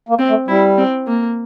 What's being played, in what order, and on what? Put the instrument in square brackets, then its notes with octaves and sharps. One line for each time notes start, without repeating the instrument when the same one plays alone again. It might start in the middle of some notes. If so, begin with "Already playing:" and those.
[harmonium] A#3
[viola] C4
[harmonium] A3
[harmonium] G3 [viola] E4
[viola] C4
A#3